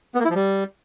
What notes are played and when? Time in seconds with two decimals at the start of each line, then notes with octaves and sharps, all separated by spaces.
0.15 B3
0.20 A#3
0.25 E4
0.30 F3
0.35 G3